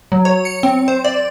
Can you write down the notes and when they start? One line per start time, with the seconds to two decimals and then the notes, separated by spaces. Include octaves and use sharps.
0.12 F#3
0.25 C#5
0.45 C#7
0.63 C4
0.88 C5
1.05 D5